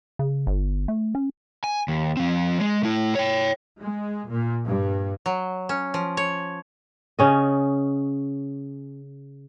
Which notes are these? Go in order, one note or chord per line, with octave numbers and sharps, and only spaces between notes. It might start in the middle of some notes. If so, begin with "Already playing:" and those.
C#3
G1
A3
C#4
G#5
D#2
F3 C4
G#3
A3 E4
C#5 G5
G#3
A#2
G2
F#3
C#4
F3
C#5
C#3 C#4 D#5